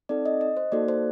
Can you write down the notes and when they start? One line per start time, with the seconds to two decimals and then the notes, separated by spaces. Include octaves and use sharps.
0.09 C4 D#4 A4 D5
0.26 D#5
0.41 D#5
0.57 C5
0.72 A#3 D#4 F#4 A4 D5
0.88 C5